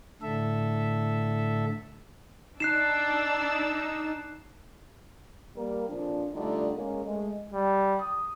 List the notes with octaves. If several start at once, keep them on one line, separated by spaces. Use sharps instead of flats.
A2 D3 A4 E5
D4 D#4 D5 E6 F#6 C7 E7
G3 A#3 A#4
F2 A#2 F3 D4
D3 G3 A3 D4 D#4 F4
G#3 A#3 C#4
G#3 A3
G3
D#6